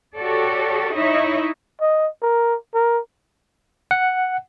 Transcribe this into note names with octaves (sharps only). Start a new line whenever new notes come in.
F#4 G4 A4 C#5 D5
D#4 E4 C#5 D#5 E5
D#5
A#4
A#4
F#5